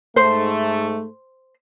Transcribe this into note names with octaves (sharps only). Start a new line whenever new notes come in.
G#2 A3 C5